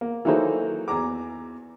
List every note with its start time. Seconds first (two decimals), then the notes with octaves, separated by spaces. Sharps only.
0.01 A#3
0.25 E3 F#3 A#3 D#4 A4 C5
0.88 E2 A#5 D6